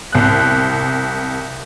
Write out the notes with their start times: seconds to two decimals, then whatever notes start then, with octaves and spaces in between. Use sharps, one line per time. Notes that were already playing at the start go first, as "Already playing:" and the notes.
0.12 C2 F#6